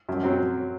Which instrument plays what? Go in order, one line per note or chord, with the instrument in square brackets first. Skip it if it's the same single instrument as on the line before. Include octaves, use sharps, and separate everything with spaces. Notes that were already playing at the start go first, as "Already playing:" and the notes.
[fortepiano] F#2
F#3 C4